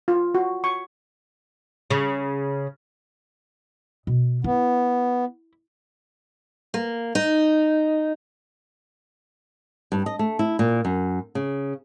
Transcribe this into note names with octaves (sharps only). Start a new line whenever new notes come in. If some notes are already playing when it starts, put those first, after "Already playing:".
F4
F#4
C#6
C#3
B2
B3 E4
A#3
D#4
G2
D#5
A3
E4
A#2
F#2
C#3